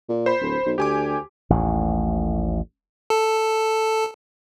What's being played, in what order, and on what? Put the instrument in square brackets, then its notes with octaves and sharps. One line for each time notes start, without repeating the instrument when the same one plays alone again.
[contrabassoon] A#2
[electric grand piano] C5 B5
[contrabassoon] D1
B1
[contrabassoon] D2 [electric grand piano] G4 G#5 D6
[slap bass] A1 D#2 A2
[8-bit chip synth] A4